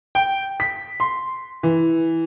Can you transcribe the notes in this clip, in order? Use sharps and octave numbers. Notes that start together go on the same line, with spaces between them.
G5
B6
C6
E3